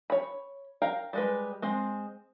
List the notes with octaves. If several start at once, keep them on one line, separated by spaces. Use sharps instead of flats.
C#5 B5
A#4 F5 G5
G3 G#3 B4
G#3 C4